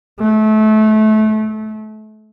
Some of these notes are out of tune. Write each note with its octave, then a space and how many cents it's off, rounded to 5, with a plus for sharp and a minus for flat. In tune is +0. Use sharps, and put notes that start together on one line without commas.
A3 -25